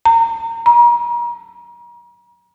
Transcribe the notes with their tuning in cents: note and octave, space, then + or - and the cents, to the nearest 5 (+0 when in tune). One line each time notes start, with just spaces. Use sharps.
A#5 -30
A#5 +40